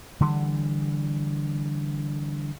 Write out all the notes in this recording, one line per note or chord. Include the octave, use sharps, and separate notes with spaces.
D3 E3 G3